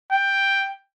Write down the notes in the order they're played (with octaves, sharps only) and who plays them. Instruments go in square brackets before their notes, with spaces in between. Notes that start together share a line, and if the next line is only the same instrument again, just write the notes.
[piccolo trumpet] G5